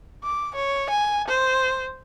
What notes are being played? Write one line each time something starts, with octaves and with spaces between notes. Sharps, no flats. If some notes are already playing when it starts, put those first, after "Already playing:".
D6
C#5
G#5
C5